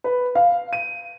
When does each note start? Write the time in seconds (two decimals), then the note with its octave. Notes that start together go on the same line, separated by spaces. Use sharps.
0.04 B4
0.35 F5
0.73 D#7